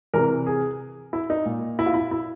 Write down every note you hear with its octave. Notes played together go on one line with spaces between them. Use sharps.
C3 E3 A#4
G#4
E4
D#4
A#2
E4
F4
E4
E4